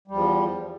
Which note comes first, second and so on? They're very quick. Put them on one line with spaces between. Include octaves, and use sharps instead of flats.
G3 E2 F3